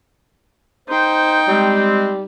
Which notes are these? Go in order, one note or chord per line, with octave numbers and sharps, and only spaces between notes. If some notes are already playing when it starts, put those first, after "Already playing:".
D#4 C5 G5
G3 G#3 C4